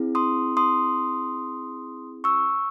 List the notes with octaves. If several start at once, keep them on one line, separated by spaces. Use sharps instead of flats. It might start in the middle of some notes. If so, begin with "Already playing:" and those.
Already playing: C4 E4 G#4
C6 D#6
C6 D#6
C#6 E6